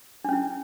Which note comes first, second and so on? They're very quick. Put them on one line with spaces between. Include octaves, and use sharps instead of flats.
D4 C#4 E4